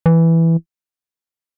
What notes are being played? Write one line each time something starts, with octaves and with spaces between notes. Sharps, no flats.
E3